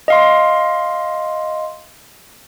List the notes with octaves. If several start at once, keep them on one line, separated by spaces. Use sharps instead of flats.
D#5 F5 C6